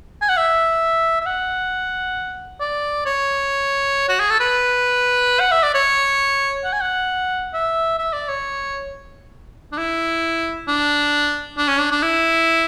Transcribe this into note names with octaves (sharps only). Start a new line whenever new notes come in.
G#5
F#5
E5
E5
F#5
D5
C#5
F#4
G#4
A4
B4
F#5
E5
D5
C#5
F#5
G#5
F#5
E5
E5
D5
C#5
D4
E4
D4
D4
C#4
D4
D4
E4